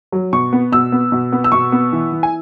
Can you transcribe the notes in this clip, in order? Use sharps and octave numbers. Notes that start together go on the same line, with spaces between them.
F#3
B2 C#6
B3
B2 E6
B3
B2
B3
E6
B2 C#6
B3
E3
E3
G#5